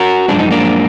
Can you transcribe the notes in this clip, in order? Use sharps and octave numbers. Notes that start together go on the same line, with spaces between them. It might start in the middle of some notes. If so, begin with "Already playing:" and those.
Already playing: F#4 A#4
F#2 F3 G#3 D4
D#4
A#3 D4